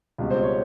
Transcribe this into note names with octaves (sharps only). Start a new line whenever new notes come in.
C#2 B2 G3
C5
C#5